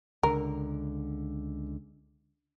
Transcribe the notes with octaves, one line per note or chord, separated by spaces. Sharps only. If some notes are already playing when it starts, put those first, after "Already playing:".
C#2 D3 A#4